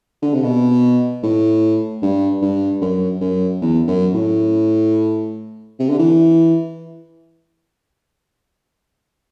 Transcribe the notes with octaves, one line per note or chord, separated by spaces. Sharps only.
D3
C3
B2
A2
G2
G2
F#2
F#2
E2
F#2
A2
C3
D3
E3